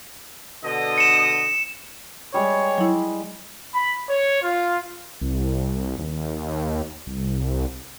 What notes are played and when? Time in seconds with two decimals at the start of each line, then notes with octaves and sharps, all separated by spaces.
0.63 B2 D3 D#5
0.98 C#7 E7
2.34 G3 G#3 C#5
2.78 F#3 E4
3.73 B5
4.09 C#5
4.41 F4
5.21 C2
5.98 D#2
7.07 C2